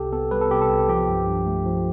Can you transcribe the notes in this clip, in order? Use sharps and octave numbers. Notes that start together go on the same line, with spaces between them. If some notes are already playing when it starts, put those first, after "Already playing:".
Already playing: C2 C3 G4 A4
B3 A4
G3 B4
A4
C3 G4
A4
C2
F3 G4
G2
G2
A3
F3